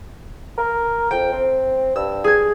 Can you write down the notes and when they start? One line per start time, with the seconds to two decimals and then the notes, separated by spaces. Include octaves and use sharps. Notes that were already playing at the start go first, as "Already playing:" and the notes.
0.58 A#4
1.11 F2 G5
1.32 C4
1.96 G2 E6
2.24 G#4 G#6